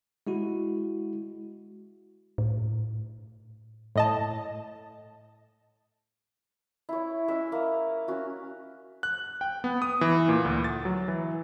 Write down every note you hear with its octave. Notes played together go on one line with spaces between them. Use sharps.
G#3 E4 F#4
A2
A2 D#5 A5
E4 C#5
G#3 C#4 E5
A#3
C#4 F#4
F#6
G5
B3
D#6
E3
A#2
D2
A6
F#3
E3